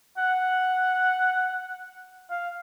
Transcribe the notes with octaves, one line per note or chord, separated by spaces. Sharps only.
F#5
F5